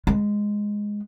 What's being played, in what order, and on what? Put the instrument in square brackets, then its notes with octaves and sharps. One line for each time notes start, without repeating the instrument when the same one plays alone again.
[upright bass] G#3